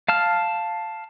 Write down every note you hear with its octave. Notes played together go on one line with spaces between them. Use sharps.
F5 A5 F6